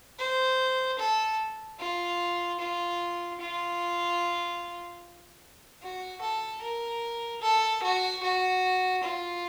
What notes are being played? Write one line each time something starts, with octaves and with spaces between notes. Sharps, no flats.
C5
A4
F4
F4
F4
F#4
A4
A#4
A4
F#4
F#4
F4